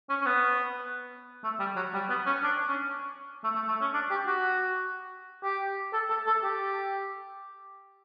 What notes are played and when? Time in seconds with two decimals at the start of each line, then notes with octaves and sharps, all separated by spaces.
0.09 C#4
0.22 C#4
0.26 B3
1.44 A3
1.60 G3
1.76 F#3
1.94 G3
2.09 B3
2.26 C#4
2.43 D4
2.68 C#4
3.44 A3
3.56 A3
3.68 A3
3.81 C#4
3.94 D4
4.11 G4
4.27 F#4
5.43 G4
5.93 A4
6.10 A4
6.27 A4
6.44 G4